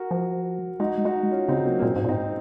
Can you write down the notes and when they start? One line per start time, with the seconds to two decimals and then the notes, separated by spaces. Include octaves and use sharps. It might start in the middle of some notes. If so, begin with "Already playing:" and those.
Already playing: F#4 A#4
0.11 F3
0.80 G#3 D#4 F#4
1.05 G#3 D#4 F#4
1.31 C#4 F4
1.48 C#3 C4 D#4
1.66 F#3 A#3
1.79 A#3
1.82 A#2 G#3 C4
1.96 G#2
2.04 A#2
2.09 G#2 C4 D#4